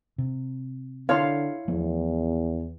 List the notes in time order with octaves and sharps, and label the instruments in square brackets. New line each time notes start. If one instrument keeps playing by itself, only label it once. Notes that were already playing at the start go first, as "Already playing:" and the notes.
[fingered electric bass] C3
[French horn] D3 [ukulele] E4 C#5 [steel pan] F5 A5 C6
[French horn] E2 [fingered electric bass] F3 A3 B3